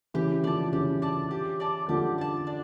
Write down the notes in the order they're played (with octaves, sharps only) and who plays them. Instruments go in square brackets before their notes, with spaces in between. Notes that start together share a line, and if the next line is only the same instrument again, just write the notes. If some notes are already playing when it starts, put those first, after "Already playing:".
[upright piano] C#3 E3 [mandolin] G4
[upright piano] D3 F3 [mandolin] D5 A5
[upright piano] F3
[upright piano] C#3 E3 [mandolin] G4
[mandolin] D5 A5
G4
D5 A5
[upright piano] D3 F3 [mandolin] G4
[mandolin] D5 A5
D4